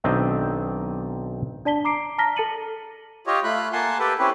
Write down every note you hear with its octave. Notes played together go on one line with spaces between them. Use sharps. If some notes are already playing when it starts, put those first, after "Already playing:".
B1 D#3 C4 D4 D#5 E5
D4 D5 A5 B6 G7
A#5 D6 C7 D7
A5 A#5 F6 A#6 B6 G7
A4 A5 A6 C#7 D#7 F#7
F4 G4 C#5 D#5
A3 F4 B5 F#6
A#3 F#5 G#5 A5 C6
G4 A4 B4 G5
C4 C#4 E4 G4 B4